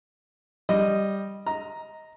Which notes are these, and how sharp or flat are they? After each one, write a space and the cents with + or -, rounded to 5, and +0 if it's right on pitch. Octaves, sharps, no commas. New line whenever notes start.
G3 +0 D#5 -5
D#5 +15 A#5 +0